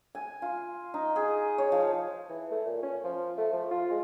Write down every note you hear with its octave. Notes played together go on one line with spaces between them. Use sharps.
G#5
F4
D#4
G#4
C#5
F3
E3
A3
A#2
C#4
F3
A3
F3
F4
G#3